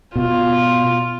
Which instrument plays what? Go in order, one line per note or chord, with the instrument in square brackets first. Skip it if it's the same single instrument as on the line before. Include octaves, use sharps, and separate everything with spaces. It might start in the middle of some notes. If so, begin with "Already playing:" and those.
[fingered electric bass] B2 [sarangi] F4